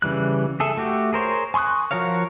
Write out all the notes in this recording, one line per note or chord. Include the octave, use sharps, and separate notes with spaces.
C#3 E3 G3 F#6
G#4 A4 E5
A3 F#4 G4
G#4 A#4 C5 C#5
G#5 C6 C#6 D#6 F#6
F3 F#4 A#4 C#5 F5